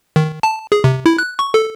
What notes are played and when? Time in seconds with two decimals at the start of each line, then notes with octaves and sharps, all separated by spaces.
0.16 D#3
0.43 A5
0.72 G#4
0.84 C3
1.06 E4
1.18 F#6
1.39 C#6
1.54 A4